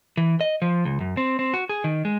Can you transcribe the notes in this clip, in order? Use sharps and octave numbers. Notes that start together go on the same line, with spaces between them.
E3
D#5
F3
C#2
F#2
C4
C4
F#4
G#4
D#3
G#3